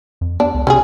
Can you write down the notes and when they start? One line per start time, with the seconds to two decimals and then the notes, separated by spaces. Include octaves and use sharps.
0.21 F2
0.40 B3 D4
0.54 C#2
0.67 C3 C#4 E4 G#4